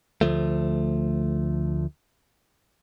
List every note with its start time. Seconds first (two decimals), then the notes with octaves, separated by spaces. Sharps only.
0.21 D2 F3 A3